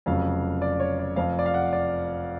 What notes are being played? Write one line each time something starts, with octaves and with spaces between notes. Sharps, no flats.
F1 F2 C#3 F#3 F5
D5
C#5
D5
F1 F2 F3 F5
D5
F5
F#5
D5